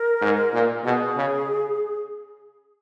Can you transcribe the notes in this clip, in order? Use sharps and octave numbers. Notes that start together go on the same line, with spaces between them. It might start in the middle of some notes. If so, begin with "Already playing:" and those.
Already playing: A#4
G#2
A#2
B2 G#4
C#3